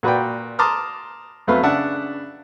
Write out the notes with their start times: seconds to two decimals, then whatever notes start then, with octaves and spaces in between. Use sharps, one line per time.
0.03 A#2 F#4 B4 D5 G5
0.59 A5 A#5 C6 D6 D#6 F6
1.47 F2 F#3 A3 B3 B4 F5
1.63 C#3 D4 E5 F#5 A5